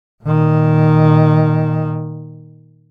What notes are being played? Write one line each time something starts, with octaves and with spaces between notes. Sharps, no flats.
A#2 D#3